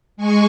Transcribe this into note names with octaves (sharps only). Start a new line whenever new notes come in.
G#3 G#5 C#6